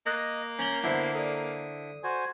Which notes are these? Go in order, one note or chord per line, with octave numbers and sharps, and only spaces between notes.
A#3 D#5 F#6 A6 A#6
C#4 A#5 G6 F#7 G7
D3 B3 E4 C5
A4 D5 D#6
F#4 C5 G#5